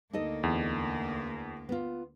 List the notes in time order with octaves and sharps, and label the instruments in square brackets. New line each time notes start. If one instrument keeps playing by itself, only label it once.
[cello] D2 A#3 [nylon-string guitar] D#4 A4 D#5
[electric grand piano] E2
[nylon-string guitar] B3 F4